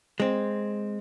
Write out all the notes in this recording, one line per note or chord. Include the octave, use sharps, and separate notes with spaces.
G#3 C4